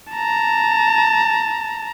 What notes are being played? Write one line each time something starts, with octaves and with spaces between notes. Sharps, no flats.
A5 A#5